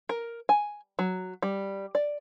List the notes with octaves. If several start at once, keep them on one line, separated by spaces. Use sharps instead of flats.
A#4
G#5
F#3
G3
D5